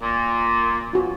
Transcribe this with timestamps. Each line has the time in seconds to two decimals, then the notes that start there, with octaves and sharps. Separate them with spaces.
0.01 A#2
0.93 F4 F#4